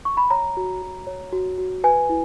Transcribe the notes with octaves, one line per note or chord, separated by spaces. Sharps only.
C#6
B5
C#5 A#5
F#4
F#4
C#5
F#4
F#4
B4 G#5
E4